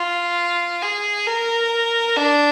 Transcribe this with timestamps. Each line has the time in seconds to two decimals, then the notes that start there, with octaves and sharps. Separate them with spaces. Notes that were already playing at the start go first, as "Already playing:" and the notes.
Already playing: F4
0.82 G#4
1.27 A#4
2.16 D4